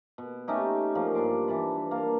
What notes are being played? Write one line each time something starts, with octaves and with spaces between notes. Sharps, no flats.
B2
A3 C#4 D#4 G4
F3 A#3
G2 D4 C6 D6
E3 A5 B5
A#3 F5 A5